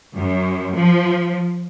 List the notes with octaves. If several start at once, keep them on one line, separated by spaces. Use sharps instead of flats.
F#2
F3